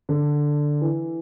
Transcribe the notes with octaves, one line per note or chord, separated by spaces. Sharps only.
D3
E3